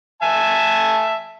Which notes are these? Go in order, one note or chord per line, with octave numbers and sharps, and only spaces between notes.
E5 G#5 A5